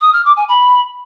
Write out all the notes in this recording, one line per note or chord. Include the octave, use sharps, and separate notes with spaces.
D#6
F6
D6
G#5
B5